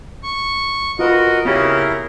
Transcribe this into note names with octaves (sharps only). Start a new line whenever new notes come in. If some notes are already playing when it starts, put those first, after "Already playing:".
C#6
F4 F#4 A#4 B4 D#5
C#3 B3 E4 G4 A#4